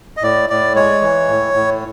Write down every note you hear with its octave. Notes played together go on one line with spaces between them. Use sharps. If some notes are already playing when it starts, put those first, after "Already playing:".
D#5
A2 D5
A2 D5
G#3 C#5
E3
A2
A2